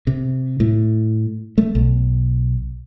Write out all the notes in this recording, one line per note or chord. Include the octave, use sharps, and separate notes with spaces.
C3
A2
A3
B1